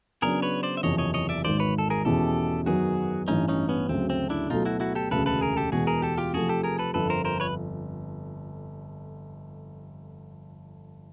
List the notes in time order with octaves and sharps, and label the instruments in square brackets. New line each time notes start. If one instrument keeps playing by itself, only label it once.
[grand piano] C#3 F#3 B3 D4 [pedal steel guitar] G#4 A#4
[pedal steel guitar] B4 C#5
C5 D5
E5
[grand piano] F#1 E2 C3 F3 [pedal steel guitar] C#5 D#5
[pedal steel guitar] C#5 D#5
C#5 D#5
D5 E5
[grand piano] G#1 G#2 D#3 [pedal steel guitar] C5 D5
[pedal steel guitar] B4 C#5
A4
G#4 A#4
[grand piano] E2 B2 G#3 C#4 E4 [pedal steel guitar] G4 A4
[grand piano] F#2 D#3 F#3 B3 [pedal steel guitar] F#4 G#4
[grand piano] A1 G2 E3 [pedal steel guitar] C#4 D#4
[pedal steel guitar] C#4 D#4
B3 C#4
[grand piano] D2 C#3 F#3 [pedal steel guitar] C4
[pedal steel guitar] C4
D4 E4
[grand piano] B2 F#3 A3 [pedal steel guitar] D#4 F4
[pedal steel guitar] E4 F#4
E4 F#4
G4 A4
[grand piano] E1 D2 C#3 [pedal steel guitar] A4 B4
[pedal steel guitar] A4 B4
G#4 A#4
G4 A4
[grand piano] E2 B2 G#3 [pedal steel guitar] F#4 G#4
[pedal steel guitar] G#4 A#4
G4 A4
F4 G4
[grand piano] C3 F3 A3 [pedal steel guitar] F#4 G#4
[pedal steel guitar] G4 A4
G#4 A#4
A4 B4
[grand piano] G1 F2 D3 [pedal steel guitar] A4 B4
[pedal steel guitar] A#4 C5
A#4 C5
B4 C#5